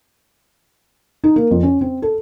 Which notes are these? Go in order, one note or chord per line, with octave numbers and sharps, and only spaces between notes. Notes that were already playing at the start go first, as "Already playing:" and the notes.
D#4
A#3
F2
C#4
C4
A4